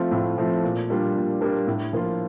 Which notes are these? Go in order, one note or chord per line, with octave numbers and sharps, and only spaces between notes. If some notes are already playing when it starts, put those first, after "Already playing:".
Already playing: F3 A3 C4 F4
A2
F3 A3 C4 F4
A#2
G3 A#3 D4 F4
A#2
G3 A#3 D4 F4
A2
F3 A#3 F4